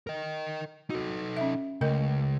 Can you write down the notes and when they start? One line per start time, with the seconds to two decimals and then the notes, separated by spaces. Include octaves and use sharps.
0.07 A#4 D#5
0.90 D#4 F#4 A4
1.37 C#4 E5
1.81 C#2 A3 A#4 D#5